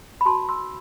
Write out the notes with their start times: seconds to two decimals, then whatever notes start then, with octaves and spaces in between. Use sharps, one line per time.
0.21 B5
0.25 F#4 A5 C6
0.30 B4
0.49 C6 E6